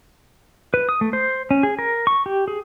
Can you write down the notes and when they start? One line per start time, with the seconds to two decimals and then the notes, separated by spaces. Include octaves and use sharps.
0.74 B4
0.89 D#6
1.01 A3
1.13 C5
1.51 C#4
1.63 G#4
1.79 A#4
2.07 C#6
2.26 G4
2.48 G#4